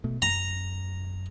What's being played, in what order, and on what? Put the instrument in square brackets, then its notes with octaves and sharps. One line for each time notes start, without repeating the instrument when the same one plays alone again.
[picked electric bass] B2 A3
[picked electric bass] F#2 [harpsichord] A#5